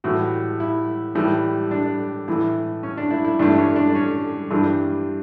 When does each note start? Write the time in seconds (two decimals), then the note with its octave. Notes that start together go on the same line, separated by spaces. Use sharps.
0.04 A2 E3 G3 F#4
0.60 E4
1.15 A2 E3 G3
1.71 D4
2.28 A2 E3 A3 E4
2.83 C#4
2.98 D4
3.11 E4
3.25 E4
3.39 G2 E3 A3 D4
3.58 C#4
3.76 D4
3.95 C#4
4.50 G2 E3 G3 D4